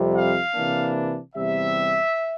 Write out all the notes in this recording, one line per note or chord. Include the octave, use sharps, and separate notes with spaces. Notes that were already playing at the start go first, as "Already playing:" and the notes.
Already playing: F2 C3 G3
F5
C3 E3 A#3 D4
E2 C3 G3 E5